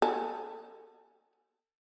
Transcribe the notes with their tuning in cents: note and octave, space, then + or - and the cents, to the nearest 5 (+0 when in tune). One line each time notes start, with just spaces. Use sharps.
A4 +30 G#5 -5